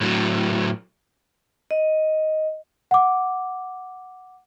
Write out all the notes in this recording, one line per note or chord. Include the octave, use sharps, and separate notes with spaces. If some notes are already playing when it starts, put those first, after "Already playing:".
A2 F#3
D#5
F#5 D6